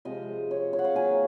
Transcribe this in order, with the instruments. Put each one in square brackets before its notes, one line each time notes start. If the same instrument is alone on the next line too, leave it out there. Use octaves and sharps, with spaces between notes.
[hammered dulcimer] C3 F3 G#3 D#5
C#5
C#5
F#5
F5
D#3 F#3 A#3 G#5